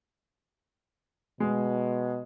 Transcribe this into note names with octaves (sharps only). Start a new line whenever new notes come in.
B2 G#3